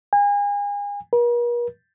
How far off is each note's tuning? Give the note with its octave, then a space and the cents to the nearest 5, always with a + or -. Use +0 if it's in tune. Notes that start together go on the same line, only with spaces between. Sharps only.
G#5 -35
A#4 +45